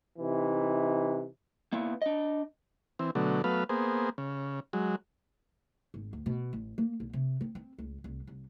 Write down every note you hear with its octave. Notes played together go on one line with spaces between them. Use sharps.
C3 E3 D#4
A#3 B3 E4
D4 D#5
E3 C4
B2 D3 F#3 A3
F#3 A3 B3 B4 F5
A#3 B3 G#4 C5
C#3
F#3 G#3
G#1
D2
B2
A1
A#3
B1
C3
C4
C4
C#2
C2
C2